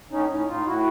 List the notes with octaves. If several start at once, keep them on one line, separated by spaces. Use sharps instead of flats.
A2 C#4 D#4
A2 C#4 D#4
A2 D#4 F4
A2 E4 F#4